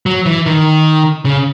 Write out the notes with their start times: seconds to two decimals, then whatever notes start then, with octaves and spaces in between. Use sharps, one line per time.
0.06 F#3
0.26 E3
0.46 D#3
1.25 C#3